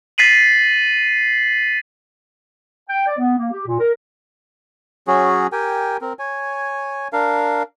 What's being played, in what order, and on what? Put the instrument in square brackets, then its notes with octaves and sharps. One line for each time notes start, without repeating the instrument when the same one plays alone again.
[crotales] A6 B6 C7 D#7 F#7
[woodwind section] G5
D5
B3
A#3
G4
A#2
A#4
[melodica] F#3 C#4 F#4 G#4
G4 A#4 G5 G#5
C4 A#4
C#5 G#5
D4 A#4 F5